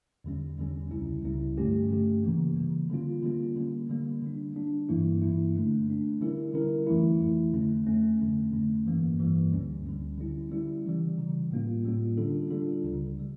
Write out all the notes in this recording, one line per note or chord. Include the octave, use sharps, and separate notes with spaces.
E2 D3 G3 C#4
E2 D3 G3 C#4
C#2 C#3 G3 C#4 E4
C#2 C#3 G3 C#4 E4
G2 D3 A3 C#4 G4
G2 D3 A3 C#4 G4
C#3 E3 G3 A#3
C#3 E3 G3 A#3
D3 G3 A#3 C#4 F4
D3 G3 A#3 C#4 F4
D3 G3 A#3
D3 G3 A#3
D3 G3 D4
D3 G3 D4
G2 E3 A#3 E4
G2 E3 A#3 E4
D3 A3 D4
D3 A3 D4
D3 G3 C#4 E4 A#4
D3 G3 C#4 E4 A#4
F2 E3 A3 E4
F2 E3 A3 E4
F2 D3 A3 C#4
F2 D3 A3 C#4
F2 D3 A3 C#4
F2 D3 A3 C#4
G2 E3 G3 A#3
G2 E3 G3 A#3
D2 D3 G3 C#4
D2 D3 G3 C#4
D3 G3 C#4 E4
D3 G3 C#4 E4
C#3 E3 G3
C#3 E3 G3
A2 G3 A#3 C#4 F4
A2 G3 A#3 C#4 F4
D3 G3 D4 F4 A4
D3 G3 D4 F4 A4
C#2 C#3 G3
C#3 G3